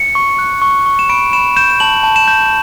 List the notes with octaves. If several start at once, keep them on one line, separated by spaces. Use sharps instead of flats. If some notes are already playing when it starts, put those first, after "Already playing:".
Already playing: C#7
C#6
F#6
C#6
C#6
E7
B5 D7
B5 E7
G6 E7
E7
A5 F#7
A5
E7
G6